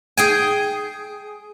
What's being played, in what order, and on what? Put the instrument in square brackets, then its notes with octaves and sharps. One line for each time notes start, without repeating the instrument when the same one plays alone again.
[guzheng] G#4 G5 G#5